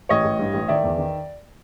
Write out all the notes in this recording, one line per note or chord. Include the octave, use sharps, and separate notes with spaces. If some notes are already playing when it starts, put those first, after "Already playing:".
A1 C#5 D#5
A1
G2
A1
D#3 D5 E5
E2
D#3